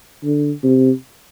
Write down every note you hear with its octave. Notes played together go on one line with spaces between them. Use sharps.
D3
C3